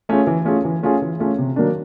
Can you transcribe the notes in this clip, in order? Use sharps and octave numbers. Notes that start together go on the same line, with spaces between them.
A3 C#4 F4 G#4
E3
A3 C#4 F4 G#4
E3
A3 C#4 F4 G#4
E3
A3 C#4 F4 G#4
C3
D#3 F#3 A#3 D4